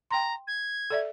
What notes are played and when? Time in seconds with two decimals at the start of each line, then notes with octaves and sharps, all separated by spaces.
0.11 G5 A#5 C6
0.47 G#6
0.90 A4 D5 E5